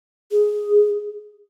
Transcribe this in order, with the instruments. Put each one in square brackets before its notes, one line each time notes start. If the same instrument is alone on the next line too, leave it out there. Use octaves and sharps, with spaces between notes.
[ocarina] G#4